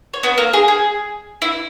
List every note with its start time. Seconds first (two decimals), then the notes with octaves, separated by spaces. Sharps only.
0.14 C#5
0.23 B3 B4
0.38 A#3 A#4
0.53 G#4
0.68 G#4
1.42 E4